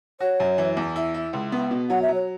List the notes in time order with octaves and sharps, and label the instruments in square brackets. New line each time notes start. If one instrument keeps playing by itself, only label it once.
[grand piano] F#4 [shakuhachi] C#5
[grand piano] F#2
E3
E2
E4
E4
C#2
B3
B2
[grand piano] F#3 [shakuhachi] F#5
[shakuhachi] E5
[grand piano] F#3
[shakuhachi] C#5